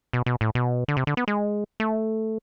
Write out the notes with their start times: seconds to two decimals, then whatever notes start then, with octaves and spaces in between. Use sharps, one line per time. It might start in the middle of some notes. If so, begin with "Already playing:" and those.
0.13 B2
0.26 B2
0.41 A2
0.55 B2
0.88 D3
0.97 C3
1.07 D3
1.17 B3
1.28 G#3
1.80 A3